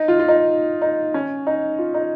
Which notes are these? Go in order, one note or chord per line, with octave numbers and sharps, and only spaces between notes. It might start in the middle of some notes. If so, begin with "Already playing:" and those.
Already playing: D#4
F4
F4
D#4
D#4
C#4
D#4
F4
D#4